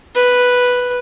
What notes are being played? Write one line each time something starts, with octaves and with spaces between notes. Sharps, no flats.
B4